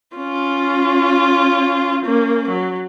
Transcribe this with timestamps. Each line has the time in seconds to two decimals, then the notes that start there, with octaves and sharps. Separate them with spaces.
0.16 C#4 F4
2.05 A#3 C#4
2.49 F#3